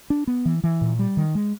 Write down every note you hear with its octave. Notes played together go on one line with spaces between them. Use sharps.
D4
B3
E3
E3
A#2
G3
D#3
G#3